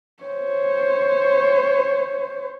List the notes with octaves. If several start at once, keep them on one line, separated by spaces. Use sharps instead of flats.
C5 C#5